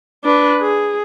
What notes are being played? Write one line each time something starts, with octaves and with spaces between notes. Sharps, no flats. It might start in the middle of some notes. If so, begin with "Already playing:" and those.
D4 B4
G#4